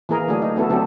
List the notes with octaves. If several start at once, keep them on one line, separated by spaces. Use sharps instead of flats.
E3 A#3 G#4 A#4
D3 F#3 A3 D4 G#4
D#4
F#3 A3 B3 E4 A4
D3 F#3 C4 G4 A4